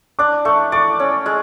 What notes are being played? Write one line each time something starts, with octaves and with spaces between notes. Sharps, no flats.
D4 D6
A3 C#6
D5 C#6
C#4
G#3